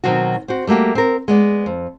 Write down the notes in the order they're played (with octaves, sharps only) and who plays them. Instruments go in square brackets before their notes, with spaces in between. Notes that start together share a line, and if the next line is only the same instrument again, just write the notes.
[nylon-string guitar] B2 D#3 F#3 C4 F#4
C4 F#4
G3 A3 A#3 F#4 G4
C4 A#4
G#3 B3 D5
F2